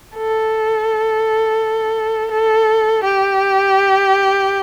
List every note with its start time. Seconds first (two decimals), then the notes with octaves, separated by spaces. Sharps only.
0.16 A4
2.31 A4
3.04 G4